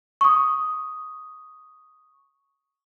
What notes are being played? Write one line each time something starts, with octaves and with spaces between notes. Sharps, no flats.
C#6 D#6